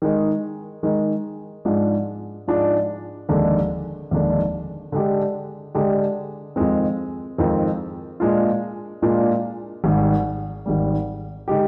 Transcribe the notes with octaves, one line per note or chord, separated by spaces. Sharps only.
D#3 G#3 D#4
D#3 G#3 D#4
G#2 F3 G#3 D4
G#2 F3 G#3 D4
F1 D#2 D3 G#3 D4
F1 D#2 D3 G#3 D4
D3 G#3 D4 G4
D3 G#3 D4 G4
F2 D#3 G#3 C4
F2 D#3 G#3 C4
A#2 G#3 D4 F4
A#2 G#3 D4 F4
G#1 G#2 G3
G#1 G#2 G3
D3 G#3 D#4 G4